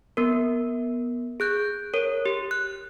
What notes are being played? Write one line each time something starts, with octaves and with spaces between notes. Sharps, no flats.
B3 A#4
G#4 F#6 G6
A#4 C#5
G4
F#6